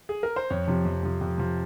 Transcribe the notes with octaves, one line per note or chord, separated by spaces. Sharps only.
G#4
A#4
C5
F2 C#5
C3 F3
F2
C3 F3
F2
C3 F3